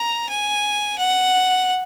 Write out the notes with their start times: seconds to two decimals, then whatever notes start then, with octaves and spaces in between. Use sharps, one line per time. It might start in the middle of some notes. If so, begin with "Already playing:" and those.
Already playing: A#5
0.29 G#5
0.99 F#5